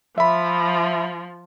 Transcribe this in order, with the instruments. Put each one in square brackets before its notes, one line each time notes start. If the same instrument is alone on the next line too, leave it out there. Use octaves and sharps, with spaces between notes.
[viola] F3 [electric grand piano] E5 B5